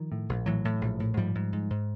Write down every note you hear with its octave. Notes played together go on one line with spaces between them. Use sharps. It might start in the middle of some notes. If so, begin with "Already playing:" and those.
Already playing: D#3 F3
A2
A#1
A2 E3 F#3
A2
A#1
A2
G#2 F3 G3
G#2
G#2
G#2